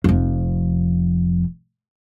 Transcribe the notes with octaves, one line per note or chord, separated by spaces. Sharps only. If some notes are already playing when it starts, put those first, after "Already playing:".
F1 F2